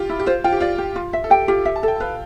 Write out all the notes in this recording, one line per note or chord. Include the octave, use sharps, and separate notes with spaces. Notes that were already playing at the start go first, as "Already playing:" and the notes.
Already playing: F4 G4
E4
G4
F4 C5
F4 G5
G4
F4 D5
G4
F4
E5
A4
G4 G5
F4 G4
E5
A5
A4
G5
B4 F5